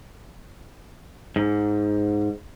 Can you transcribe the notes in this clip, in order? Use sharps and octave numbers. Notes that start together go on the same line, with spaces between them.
G#2